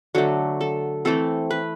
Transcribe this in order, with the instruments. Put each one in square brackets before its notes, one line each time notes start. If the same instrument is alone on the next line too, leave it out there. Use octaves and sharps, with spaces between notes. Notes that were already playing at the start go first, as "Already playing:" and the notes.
[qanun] D3 F#3 A3 F#4
A4
E3 A3 C4 A4
B4